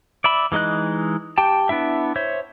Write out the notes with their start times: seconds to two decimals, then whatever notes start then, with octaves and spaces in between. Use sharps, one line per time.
0.24 D5 E5 B5
0.52 E3 G#3 D#4 D#5 F#6
1.38 G4 G5 A5
1.69 B3 D4 E4 E5
2.16 C5 C#5 E5